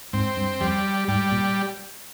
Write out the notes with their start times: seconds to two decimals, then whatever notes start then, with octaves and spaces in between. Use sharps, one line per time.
0.13 G#2 C4
0.37 G2
0.60 F2 G3
1.08 G#2 G3
1.32 A#2